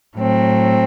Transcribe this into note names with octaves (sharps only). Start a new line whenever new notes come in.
A2 F#3 C4